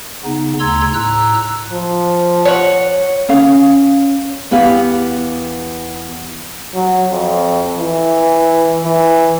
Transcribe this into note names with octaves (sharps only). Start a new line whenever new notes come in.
C#3 B3 D#4
D2 C#3 A#5 C6 E6 G#6
A2 A#5 E6 F#6
F3
C#5 F#5
C#4 F5
E2 B3 G4 B4 F5
F#3
F2
E3
E3